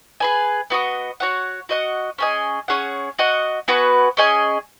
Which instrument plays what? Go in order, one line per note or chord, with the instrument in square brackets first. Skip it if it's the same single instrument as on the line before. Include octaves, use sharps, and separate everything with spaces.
[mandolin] G#4 B4 G#5
B3 F#4 D#5
F#4 C#5 F#5
F#4 D#5 F#5
C#4 G#4 D#5 G#5
C#4 G#4 C#5 F#5
F#4 D#5 F#5
B3 F#4 B4 G#5
C#4 G#4 D#5 G#5